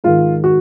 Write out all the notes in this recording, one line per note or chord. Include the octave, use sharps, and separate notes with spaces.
G#2 D#3 F4
F#4